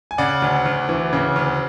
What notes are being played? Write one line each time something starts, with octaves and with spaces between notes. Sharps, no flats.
G#5
C#3 D5 F#5
D2
D2
E3
C#3
D2